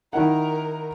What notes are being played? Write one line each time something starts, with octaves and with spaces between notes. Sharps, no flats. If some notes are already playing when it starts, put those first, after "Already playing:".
D#3 E4 A#4 F#5